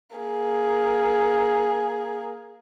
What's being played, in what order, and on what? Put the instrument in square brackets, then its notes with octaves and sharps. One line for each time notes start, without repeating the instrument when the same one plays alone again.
[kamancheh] A#3 G#4